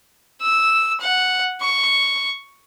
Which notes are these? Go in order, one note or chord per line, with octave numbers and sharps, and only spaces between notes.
E6
F#5
C#6